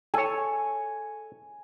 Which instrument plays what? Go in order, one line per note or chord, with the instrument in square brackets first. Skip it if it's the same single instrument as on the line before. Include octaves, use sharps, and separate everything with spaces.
[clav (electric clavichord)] A4 C#5 [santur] G#5